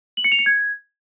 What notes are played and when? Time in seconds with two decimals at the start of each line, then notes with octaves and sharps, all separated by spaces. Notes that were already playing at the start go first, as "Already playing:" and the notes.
0.17 F#7
0.24 C#7
0.32 F7
0.39 C#7
0.46 G#6